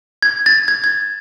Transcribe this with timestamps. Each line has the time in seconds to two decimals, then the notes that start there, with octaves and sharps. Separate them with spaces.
0.23 G#6
0.46 A6
0.68 G#6
0.84 G#6